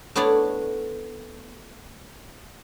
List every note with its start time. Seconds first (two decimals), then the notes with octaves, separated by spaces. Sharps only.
0.16 A3 B3 D4 E4 C#5 D5